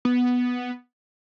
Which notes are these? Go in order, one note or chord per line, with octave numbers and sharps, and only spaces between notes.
B3